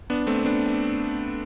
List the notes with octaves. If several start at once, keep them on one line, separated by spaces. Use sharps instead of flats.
B3 D4
A3 C4
B3 D4